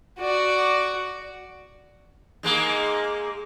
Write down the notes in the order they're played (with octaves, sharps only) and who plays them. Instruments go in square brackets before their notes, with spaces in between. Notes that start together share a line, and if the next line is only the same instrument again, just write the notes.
[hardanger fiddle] F#4 D5
[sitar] G#2 G#3 A#3